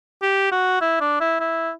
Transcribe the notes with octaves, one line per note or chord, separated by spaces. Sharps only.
G4
F#4
E4
D4
E4
E4